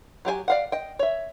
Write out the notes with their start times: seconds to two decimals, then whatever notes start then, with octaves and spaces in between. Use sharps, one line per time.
0.25 F#3 G4 G#4 G#5
0.48 D5 F5 F#5
0.72 D#5 G5
0.99 C#5 E5